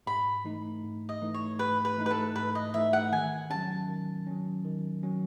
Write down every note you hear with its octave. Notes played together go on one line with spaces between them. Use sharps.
G#2 B5
E3 A3 D#4
G#2
D#5
E3 A3 D#4
C#5
G#2 B4
B4
E3 A3 D#4
B4
A4
G#2 B4
D#5
E3 A3 D#4 E5
F#5
D#3 G#5
F#3 C#4 A5
D#3
F#3 C#4
D#3
F#3 C#4